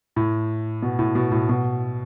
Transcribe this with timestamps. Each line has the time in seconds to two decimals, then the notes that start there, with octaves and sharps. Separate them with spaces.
0.16 A2
0.83 B2
0.99 A2
1.15 B2
1.32 A2
1.49 B2